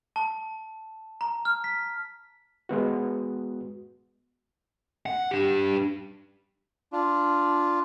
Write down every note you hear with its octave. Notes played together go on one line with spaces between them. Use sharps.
A5
A#5
F6
B6
G#3 B3 F#4
F#5
D4 G4
D4 F4